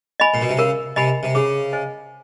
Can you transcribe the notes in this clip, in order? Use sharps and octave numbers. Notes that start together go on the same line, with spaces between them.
D#5 G#5 B5
A#2
B2
C3
C#3 A#4
C3 D#5 G#5 B5
C3
C#3 G#4
C5 D#5 G#5